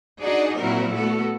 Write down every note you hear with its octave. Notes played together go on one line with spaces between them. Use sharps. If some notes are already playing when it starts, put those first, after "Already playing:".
D4 D#4 F#4 G#4 D5
A#2 F#3 C4 E4 F#4 A#4
A3 B3 F#4 A4